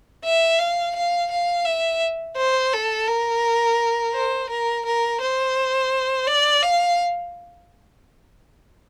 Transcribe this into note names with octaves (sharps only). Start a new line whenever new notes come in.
E5
F5
F5
F5
E5
C5
A4
A#4
C5
A#4
A#4
C5
D5
F5